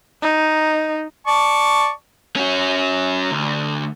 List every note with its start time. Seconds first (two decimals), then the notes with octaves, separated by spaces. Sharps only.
0.22 D#4
1.27 D5 A5 C#6
2.36 C#4 F#4
3.31 D2